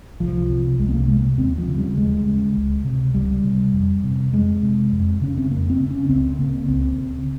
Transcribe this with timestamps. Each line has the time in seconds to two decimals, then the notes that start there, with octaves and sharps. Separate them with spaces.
0.20 C2 F3
0.50 C3
0.79 C2 G#3
0.89 C4
0.94 A#3
1.08 C3 G#3
1.38 D#2 C4
1.58 F3
1.68 C#3
1.77 G3
1.97 D#2 G#3
2.26 C#3
2.56 C#2
2.85 C3
3.14 C#2 G3
3.44 C3
3.73 F2
4.04 C3
4.32 F2 G#3
4.63 C3
4.92 F2
5.21 C#3 C#4
5.37 C4
5.50 F2 A#3
5.70 C4
5.80 C#3
5.91 C#4
6.09 C#2 C4
6.39 C#3 A#3
6.68 C#2 C4
6.99 C#3